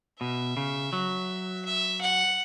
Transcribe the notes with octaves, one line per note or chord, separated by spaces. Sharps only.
B2 E5
C#3
F#3
E5
F#5